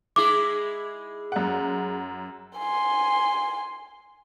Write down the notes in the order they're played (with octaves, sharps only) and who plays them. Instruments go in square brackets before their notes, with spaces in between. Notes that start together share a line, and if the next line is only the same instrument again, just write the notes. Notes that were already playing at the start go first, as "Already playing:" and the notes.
[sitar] G#3 E4 G#4 [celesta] D6
[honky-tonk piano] F#2 F#5
[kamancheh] G#5 C6